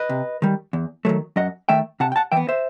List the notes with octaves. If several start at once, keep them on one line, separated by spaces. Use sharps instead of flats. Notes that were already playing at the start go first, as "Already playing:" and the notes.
Already playing: B4 D#5
C3
D#3 G3
E2
D#3 F#3 A3
F#2 D#5 F#5
D#3 A3 E5 G5
C3 F#5 A5
G5
F#5 A5
E3 B3 E5 G5
C5 E5